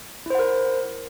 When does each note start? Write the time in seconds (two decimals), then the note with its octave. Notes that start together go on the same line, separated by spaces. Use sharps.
0.26 E4
0.30 C5
0.35 F#5
0.39 A#4